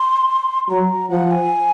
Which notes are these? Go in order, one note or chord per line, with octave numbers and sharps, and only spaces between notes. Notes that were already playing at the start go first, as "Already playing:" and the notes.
Already playing: C6
F#3 A#5
F3 F#5
G#5